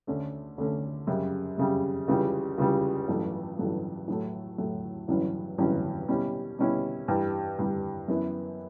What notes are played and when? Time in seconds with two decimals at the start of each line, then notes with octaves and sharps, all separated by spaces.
0.07 D2 D3 A3 C#4
0.58 D2 D3 A3 C#4
1.07 F#2 C#3 G3
1.58 F#2 C#3 G3
2.08 C#2 C#3 E3 G3
2.58 C#2 C#3 E3 G3
3.08 A1 G2 F#3 A3
3.59 A1 G2 F#3 A3
4.08 A2 F#3 A3
4.58 A2 F#3 A3
5.08 A1 G2 F#3 C#4 E4
5.58 A1 G2 F#3 C#4 E4
6.08 B2 G3 C#4 E4
6.59 B2 G3 C#4 E4
7.08 G2 E3 G3
7.59 G2 E3 G3
8.08 F#2 E3 B3 E4